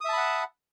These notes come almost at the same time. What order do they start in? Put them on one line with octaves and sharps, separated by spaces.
D#6 E5 A5 B5 F#5